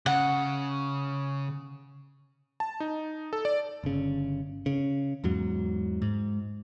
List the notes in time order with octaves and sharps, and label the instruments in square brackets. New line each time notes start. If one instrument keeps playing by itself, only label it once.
[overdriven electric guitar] C#3 [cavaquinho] F#5
[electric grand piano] A5
D#4
A4
D5
[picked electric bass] G1 C#3
C#3
E2 G#2 F#3
G#2